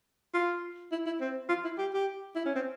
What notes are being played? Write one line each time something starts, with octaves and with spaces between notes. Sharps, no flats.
F4
E4
E4
C4
F4
E4
G4
G4
E4
C#4
C4